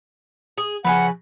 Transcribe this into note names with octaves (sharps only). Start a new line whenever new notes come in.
G#4
C#3 E3 F3 B4 F#5 G#5